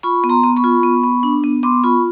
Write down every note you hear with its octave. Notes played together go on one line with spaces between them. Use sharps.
F4 B5 C#6
B3
A#5 C6
B3
B5 C#6
F4
B3
B3
D4
B3
B3 C6 D6
F4 B5 C#6